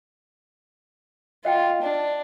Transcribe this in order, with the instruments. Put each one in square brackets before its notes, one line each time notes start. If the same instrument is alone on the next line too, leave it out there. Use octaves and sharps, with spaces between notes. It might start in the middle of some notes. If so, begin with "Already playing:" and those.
[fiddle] F4 [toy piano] D#5 F#5 G5
[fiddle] D4